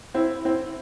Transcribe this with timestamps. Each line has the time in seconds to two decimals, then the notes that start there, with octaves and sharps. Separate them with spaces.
0.14 C4 E4
0.45 C4 E4